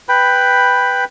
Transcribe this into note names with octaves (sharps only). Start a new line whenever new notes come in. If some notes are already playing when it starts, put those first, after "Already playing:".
B4 G5 B5